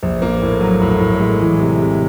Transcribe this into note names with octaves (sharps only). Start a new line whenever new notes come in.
A#1
A#3
A2
F#3
A2
A2
G#3
E3
C3
C3